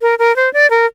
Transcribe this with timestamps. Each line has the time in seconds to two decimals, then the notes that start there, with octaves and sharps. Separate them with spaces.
0.02 A#4
0.19 A#4
0.36 C5
0.53 D5
0.70 A#4